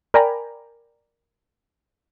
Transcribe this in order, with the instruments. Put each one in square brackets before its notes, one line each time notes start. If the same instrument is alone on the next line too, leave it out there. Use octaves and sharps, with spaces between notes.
[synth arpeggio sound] A#4 D5 G5 G#5 A#5 B5